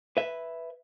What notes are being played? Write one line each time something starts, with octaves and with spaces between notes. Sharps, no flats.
B4 E5